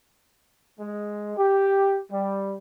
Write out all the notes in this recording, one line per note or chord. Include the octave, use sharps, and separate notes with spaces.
G#3
G4
G3